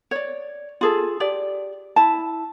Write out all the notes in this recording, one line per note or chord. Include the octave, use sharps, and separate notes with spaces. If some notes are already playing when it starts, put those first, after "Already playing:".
C#5 D5
F4 G#4 A4
G4 D5
E4 A5